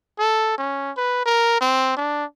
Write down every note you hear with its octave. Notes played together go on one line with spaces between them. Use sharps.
A4
C#4
B4
A#4
C4
D4